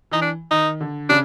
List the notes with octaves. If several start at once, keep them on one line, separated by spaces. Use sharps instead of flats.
E3 D#4
D4
D#3 D#4
D3
C#3 D4